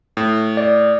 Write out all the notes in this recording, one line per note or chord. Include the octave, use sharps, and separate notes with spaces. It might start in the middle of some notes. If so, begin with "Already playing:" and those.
A2
D5